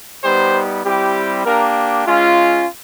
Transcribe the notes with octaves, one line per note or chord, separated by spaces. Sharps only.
G3 B3 D#4 G4 C5
G3 C4 E4 G4
A#3 D4 G4 A#4
G#3 C#4 F4